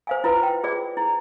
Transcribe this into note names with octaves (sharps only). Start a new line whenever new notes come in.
C5 F5 G#5
E4 F4 B4 C5
G5
F4 G#4 D5
E4